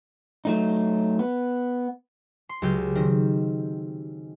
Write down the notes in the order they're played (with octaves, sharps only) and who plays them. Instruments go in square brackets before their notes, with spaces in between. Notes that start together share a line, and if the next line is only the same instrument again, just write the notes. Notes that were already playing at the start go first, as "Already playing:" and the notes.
[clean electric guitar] F#3 A3 D#4
B3
[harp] C6
C#2 F#3 G4 G6
D#3 C4